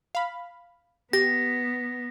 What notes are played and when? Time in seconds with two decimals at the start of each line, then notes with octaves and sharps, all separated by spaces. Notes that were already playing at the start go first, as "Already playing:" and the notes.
0.15 F5 B5
1.13 B3 G4 A#6